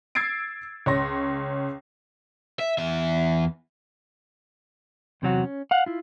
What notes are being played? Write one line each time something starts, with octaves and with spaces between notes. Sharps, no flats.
E6 G#6 A6 C7 D7
C#2 C#5 C6 A#6
E5
E2 E5
E2 C3 F#3 F#4
C#4
F5 F#5
E4 F4